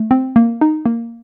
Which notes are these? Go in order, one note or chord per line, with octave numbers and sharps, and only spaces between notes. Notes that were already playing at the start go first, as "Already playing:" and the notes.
Already playing: A3
C4
A#3
D#4
A#3